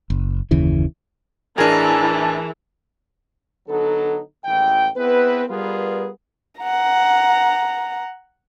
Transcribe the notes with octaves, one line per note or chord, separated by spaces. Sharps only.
F#1
F#1 D#2 C#3 E3
A1 E3 D4 G#4 A#4 G#5 A5
D3 F#3 B3 D#4 A4
A1 D#2 E3 G#3 G5
B3 C4 E4 G#4 B4
G3 B3 F4 G#4 A#4 B4
F#5 A#5